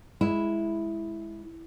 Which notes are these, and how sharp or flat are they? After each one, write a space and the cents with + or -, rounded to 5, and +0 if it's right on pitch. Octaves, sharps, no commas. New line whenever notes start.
G#3 +0 E4 +0